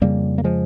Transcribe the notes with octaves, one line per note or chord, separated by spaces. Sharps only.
F2 C#3 G3 A#3
A#3
F3 G#3